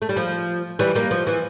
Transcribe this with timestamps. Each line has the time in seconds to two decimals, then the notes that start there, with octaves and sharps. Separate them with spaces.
0.02 A3
0.09 G3
0.16 F3
0.79 E3 G3
0.95 G3 A#3
1.11 F3
1.27 E3